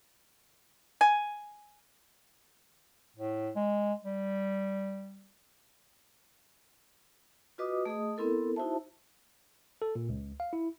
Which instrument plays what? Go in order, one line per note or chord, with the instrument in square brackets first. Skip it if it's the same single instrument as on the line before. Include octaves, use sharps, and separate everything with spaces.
[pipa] G#5
[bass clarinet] A2
G#3
G3
[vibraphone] F4 F#4 B4 D#5 D6 D#6
A3 G#4 D#5 D#6
B3 C4 E4 A4 A#4
D#4 E4 F#4 C5 E5 A5
[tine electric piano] A4
A#2
C#2
F5
E4